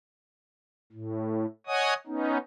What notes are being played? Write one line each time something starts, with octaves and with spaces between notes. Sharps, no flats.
A2
C#5 D#5 F#5 G#5 D#6
B3 C#4 D#4